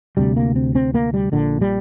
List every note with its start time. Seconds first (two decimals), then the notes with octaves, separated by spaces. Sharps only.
0.17 D2 C3 G3
0.37 A#3
0.56 C4
0.75 C4
0.94 A#3
1.14 G3
1.32 A#1 A#2 D3
1.61 G3